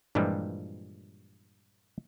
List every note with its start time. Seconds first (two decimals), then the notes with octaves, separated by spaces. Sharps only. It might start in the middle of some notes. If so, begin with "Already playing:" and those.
0.15 G2 A#2 E3 F3 G3 G#3